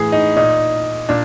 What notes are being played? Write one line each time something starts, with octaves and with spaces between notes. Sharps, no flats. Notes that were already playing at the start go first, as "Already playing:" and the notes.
Already playing: A2 E3 G#4
D#4
A#2 D#4
A#2 D4